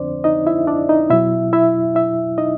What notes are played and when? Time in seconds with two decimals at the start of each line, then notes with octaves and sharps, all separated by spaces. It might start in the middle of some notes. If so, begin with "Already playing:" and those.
Already playing: F2 D3 F3 C4 D4 C5 D5
0.24 D#4 D#5
0.46 E4 E5
0.67 D4 D5
0.89 D#4 D#5
1.10 B2 F#3 E4 E5
1.53 E4 E5
1.95 E4 E5
2.38 D#4 D#5